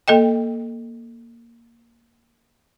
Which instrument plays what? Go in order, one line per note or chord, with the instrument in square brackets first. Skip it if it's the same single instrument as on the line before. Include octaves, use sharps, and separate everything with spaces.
[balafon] A#3 A4 D#5 G5